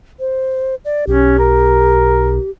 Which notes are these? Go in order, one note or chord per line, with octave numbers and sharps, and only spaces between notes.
C5
D5
B1 C#4 G4
A#4